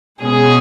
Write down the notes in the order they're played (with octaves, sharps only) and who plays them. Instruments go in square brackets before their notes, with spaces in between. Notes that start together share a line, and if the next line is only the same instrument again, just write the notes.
[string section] B2 G#3 C#4 G#4